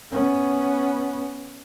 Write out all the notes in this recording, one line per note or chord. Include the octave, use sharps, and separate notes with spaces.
B3 C#4